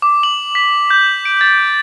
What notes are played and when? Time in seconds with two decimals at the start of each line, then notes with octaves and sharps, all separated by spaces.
0.02 D6
0.23 F#7
0.55 B6
0.90 G6
1.25 D7
1.41 A6